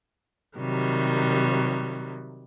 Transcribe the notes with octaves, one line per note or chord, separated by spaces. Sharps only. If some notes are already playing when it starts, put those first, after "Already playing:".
C3 D#3 F#3 G3